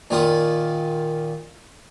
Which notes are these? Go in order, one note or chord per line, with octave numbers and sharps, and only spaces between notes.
A#2 D#3 F4 D#6